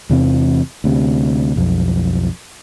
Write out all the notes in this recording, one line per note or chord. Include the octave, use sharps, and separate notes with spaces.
E2 C3 E3 C4
D2 C3
B1 F2